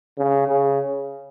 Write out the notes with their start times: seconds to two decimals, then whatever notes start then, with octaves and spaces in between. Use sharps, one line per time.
0.18 C#3
0.48 C#3